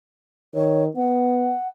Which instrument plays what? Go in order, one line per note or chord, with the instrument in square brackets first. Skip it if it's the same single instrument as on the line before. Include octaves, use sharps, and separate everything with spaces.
[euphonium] D#3 [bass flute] C#5
[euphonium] B3 [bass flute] F#5